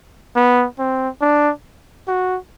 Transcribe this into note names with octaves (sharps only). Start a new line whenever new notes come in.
B3
C4
D4
F#4